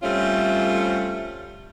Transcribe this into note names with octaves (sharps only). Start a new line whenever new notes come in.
G3 A3 C4 C#4 F4